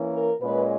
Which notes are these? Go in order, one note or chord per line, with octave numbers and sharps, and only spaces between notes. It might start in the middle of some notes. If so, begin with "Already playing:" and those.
Already playing: E3 A#3 C#4
A#4
A#2 G#3 C#4 B4